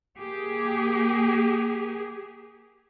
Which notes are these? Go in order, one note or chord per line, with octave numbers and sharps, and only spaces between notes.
A#3 G4 G#4